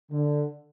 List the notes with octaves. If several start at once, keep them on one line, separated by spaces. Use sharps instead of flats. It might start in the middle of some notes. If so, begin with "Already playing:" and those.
D3